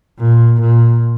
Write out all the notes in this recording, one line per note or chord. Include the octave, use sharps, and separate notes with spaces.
A#2
A#2